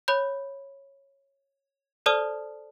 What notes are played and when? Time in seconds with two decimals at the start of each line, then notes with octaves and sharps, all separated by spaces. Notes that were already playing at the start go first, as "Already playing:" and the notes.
0.08 C#5 B5 G6
2.06 A4 C5 D5 A5 D#6 F6